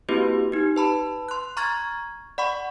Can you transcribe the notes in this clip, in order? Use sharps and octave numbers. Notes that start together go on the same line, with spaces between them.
A#3 C4 E4 F#4 G4 B4
D#4 G4
B4 A5 B5
C6 F#6
A#5 C#6 F6 G#6 A6
D5 F#5 B5 C#6